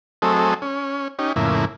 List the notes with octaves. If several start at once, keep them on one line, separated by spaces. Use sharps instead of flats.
F#3 A3 C4 G#4 A4 D#5
C#4
C#4 D#4 G4
F2 A2 C#3 A#3 E4